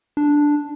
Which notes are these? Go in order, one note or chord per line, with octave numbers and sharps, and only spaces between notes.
D4